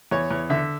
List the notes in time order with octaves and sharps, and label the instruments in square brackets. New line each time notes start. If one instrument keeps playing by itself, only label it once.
[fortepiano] E2 C#5
E2
D3 E5